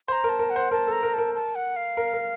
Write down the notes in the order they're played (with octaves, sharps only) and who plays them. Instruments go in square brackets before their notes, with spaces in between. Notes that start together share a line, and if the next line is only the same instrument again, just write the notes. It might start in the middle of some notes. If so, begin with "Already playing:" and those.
[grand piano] C5 [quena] A#5 C6
[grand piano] A#4
[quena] A5
[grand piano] A#4
[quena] F#5
[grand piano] C5
[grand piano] A#4 [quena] A5
[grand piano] A4 [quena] A#5
[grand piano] A#4
[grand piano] A#4 [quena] A5
[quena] A5
F#5
F5
[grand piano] A#4
A#4